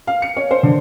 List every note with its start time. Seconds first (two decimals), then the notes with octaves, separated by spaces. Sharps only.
0.07 F5
0.22 C#7
0.37 C#5
0.51 C5
0.63 D3